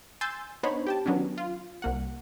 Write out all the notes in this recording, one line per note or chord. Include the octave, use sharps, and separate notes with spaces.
G#5 C6 E6 G6 A6 C7
B3 D4 D#4 C5 C#5 B5
G4 G5 A5
D#3 F#3 B3 C#4 D4
F4
C2 A#3 F#5